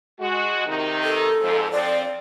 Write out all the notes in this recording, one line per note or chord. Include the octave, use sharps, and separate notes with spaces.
G#3 F#4
C3 D#3 D#4
A4
F2 G#2 F3
F3 C4 D5